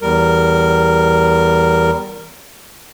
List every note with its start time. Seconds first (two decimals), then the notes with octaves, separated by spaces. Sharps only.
0.01 E2 G3 A#4